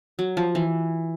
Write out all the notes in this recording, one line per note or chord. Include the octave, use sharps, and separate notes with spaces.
F#3
F3
E3